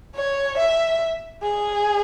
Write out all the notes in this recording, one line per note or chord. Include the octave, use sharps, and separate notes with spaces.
C#5
E5
G#4